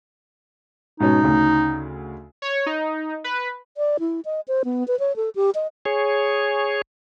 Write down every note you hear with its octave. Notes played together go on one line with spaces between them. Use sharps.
G#2 B2 C#4 D#4
D2 C#3
C#5
D#4
B4
D5
E4
D#5
C5
B3
B4
C#5
A4
G4
D#5
G#4 C#5